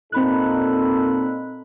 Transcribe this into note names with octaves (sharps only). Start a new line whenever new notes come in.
A#2 C4 D#4 A4 B5 F#6